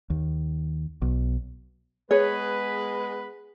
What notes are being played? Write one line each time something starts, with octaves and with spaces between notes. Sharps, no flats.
D#2
B1
G#3 B3 G#4 B4 C#5